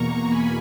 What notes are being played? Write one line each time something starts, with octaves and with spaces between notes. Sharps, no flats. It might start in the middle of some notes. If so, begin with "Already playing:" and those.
Already playing: E2 B2 A#3 A#5 C#6
G#5 B5